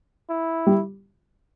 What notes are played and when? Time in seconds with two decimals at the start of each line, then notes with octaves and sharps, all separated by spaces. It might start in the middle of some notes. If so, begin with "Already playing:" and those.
0.30 E4
0.67 G3